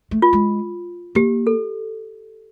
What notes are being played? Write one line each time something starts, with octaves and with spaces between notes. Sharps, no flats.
A3
F4
G#3
A#3 G4
A4